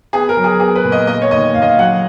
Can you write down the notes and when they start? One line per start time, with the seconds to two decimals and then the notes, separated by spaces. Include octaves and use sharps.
0.13 B3 G#4
0.29 A#4
0.37 F#3
0.44 G#4
0.60 B3 G#4
0.76 B4
0.84 A#2
0.92 D#5
1.07 A#3 D#5
1.22 C#5
1.31 D#2 D#5
1.54 D#2 F5
1.62 D#5
1.69 F5
1.78 F#3 F#5